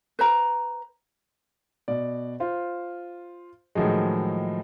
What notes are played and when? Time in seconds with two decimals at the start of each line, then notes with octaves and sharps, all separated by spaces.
0.19 B4 C5 A#5
1.88 B2 D5
2.40 F4 C5
3.75 A2 D#3 F3 F#3 G#3